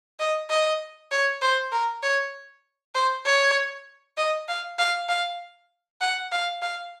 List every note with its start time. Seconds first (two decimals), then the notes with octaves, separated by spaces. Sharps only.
0.20 D#5
0.50 D#5
1.11 C#5
1.42 C5
1.72 A#4
2.03 C#5
2.95 C5
3.25 C#5
4.17 D#5
4.48 F5
4.79 F5
5.09 F5
6.01 F#5
6.32 F5
6.62 F5